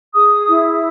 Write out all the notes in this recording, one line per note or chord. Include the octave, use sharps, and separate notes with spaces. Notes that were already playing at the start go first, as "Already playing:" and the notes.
G#4 D#6
E4